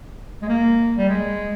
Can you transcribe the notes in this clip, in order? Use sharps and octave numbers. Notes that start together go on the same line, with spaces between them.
G#3
A#3
G3
G#3